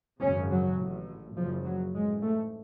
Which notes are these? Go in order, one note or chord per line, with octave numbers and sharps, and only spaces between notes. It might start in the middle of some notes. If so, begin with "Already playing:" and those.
G#1 F#2 C#3 C#4
F#3
A1 A2
F#1 F#2 C#3 F3
F#3
A1 G#2 G#3
A3